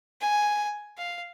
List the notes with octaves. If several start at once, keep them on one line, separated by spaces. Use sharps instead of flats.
G#5
F5